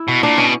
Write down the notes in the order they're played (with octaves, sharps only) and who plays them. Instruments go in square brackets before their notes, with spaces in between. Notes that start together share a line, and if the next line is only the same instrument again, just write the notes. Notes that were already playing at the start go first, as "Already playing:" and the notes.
Already playing: [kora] E4
[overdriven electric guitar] B2
[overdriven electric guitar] A#2 [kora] D4
[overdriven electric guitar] B2 [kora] C#4